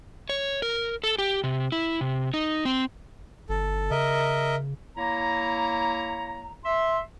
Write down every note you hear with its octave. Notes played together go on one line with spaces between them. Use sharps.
C#5
A#4
A4
G4
C3
E4
C3
D#4
C4
G1 A4
C#3 A#4 D#5 E5
A#3 E4 C#5 A#5
E5 C6